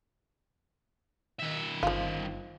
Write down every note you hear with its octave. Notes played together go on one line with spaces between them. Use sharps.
D#3 E5
G1 F3 F4